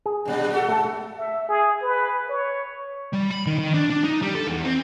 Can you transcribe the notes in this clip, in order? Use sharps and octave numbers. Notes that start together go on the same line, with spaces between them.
G#4
G2 A#2 G3
F#4 A4
A3 A5
E5
G#4
B4
C#5
G3
B5
D#3
D#3
D4
D4
D#4
G3
A4
E2
C4